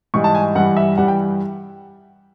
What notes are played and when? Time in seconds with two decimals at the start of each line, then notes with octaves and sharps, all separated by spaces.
0.14 G#2 E3 G3 C#6
0.24 A5
0.35 G#5
0.55 G2 E3 G3 F#5
0.77 E5
0.98 G2 E3 G3 F#5
1.08 G5